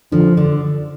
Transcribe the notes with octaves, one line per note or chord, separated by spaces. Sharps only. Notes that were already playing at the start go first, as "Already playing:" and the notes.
D3 F3
D3